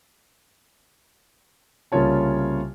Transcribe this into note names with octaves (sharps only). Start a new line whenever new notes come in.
C2 C#3 A#3 F4 C#5 A5